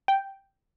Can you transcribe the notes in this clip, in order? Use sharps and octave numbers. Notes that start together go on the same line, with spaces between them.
G5